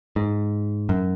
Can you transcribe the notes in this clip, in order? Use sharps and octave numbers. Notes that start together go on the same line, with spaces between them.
G#2
F#2